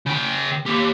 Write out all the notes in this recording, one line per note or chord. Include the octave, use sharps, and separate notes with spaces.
C#3 G5
A#3 G4